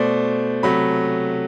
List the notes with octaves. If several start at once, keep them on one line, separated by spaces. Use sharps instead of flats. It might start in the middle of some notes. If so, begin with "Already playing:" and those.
Already playing: B2 A3 C5 D5
C3 F#3 A3 B5